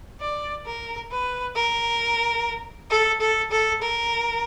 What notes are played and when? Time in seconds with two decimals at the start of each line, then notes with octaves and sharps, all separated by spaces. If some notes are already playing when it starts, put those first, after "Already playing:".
0.20 D5
0.66 A#4
1.11 B4
1.55 A#4
2.90 A4
3.20 A4
3.51 A4
3.82 A#4